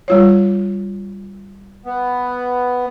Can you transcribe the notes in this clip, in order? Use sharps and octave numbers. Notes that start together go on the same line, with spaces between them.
G3 F4 C#5
B3